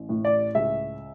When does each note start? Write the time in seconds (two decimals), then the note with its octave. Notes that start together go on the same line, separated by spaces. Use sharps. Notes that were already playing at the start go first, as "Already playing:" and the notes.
Already playing: A1
0.09 A2
0.25 D5
0.55 C#2 E5